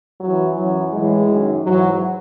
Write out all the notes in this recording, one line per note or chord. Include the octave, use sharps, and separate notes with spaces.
F#2 E3 F#3
F#2 E3 F#3
A2 E3 G#3
F#2 D#3
G#2 E3 F#3